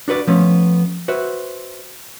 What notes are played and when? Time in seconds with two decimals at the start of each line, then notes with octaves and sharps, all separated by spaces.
0.08 D4 F#4 B4 D5
0.27 F3 A3 B3 C#4
1.08 F#4 B4 C5 E5